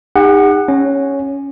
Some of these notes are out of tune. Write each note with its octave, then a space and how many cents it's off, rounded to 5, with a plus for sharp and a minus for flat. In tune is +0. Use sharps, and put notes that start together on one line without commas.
D#4 -5 G4 +45 F#5 +0
C#4 +0 C#5 +0